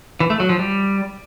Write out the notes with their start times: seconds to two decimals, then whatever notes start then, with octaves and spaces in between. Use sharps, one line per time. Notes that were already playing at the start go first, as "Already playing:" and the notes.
0.20 E3
0.30 A3
0.40 F#3
0.49 F3
0.59 G3